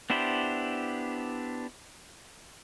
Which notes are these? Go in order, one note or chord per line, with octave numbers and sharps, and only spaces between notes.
B3 D4 E4 G4 C5